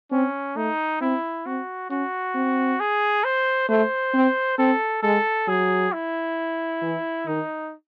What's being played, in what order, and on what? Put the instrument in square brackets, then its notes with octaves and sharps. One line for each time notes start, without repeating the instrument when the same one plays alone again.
[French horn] C4 [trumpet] C#4
[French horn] A3 [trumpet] D#4
[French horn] C4 [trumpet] E4
[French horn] C4 [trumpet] F#4
[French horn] C#4 [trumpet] F#4
[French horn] C4
[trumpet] G#4
C5
[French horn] A3 [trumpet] C5
[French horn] C4
[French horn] C4 [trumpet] A4
[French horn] G#3 [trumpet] A4
[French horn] F#3 [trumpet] G#4
[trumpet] E4
[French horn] E3
[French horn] D#3 [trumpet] D#4